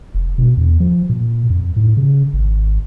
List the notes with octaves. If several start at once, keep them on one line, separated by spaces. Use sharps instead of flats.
F1
B2
E2
F3
A#2
F2
A2
C#3
G#1